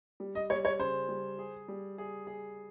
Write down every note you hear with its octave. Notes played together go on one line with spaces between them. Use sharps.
G3
D#5
G3 C#5
C#5
C#3 C5
G3
G#4
G3
G#4
G#4